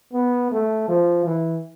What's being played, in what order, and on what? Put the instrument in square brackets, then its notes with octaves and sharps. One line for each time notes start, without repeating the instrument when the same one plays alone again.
[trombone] B3
A3
F3
E3